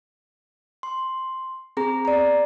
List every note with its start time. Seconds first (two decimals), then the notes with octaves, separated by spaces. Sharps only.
0.83 C6
1.77 C4 G#4 A#5
2.05 D5 A#5